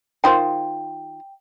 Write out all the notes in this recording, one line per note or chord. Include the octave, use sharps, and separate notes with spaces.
D#3 F4 C5 G5